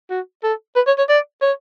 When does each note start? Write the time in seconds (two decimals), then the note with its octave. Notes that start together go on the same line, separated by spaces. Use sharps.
0.10 F#4
0.43 A4
0.76 B4
0.87 C#5
0.98 C#5
1.09 D5
1.42 C#5